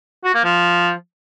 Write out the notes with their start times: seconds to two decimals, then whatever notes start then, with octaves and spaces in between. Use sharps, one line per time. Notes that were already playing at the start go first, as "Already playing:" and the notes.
0.24 F#4
0.34 A#3
0.44 F3